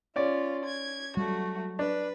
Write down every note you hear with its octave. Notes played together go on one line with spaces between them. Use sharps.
C#4 F4 D5
G#6
F#3 G3 A3 F#4
D4 B4